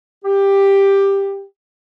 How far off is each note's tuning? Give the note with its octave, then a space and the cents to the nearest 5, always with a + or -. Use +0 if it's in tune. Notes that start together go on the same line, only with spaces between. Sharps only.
G4 +10